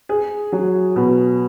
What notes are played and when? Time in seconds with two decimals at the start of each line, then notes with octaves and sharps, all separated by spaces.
0.09 G#4
0.52 F#3
0.96 B2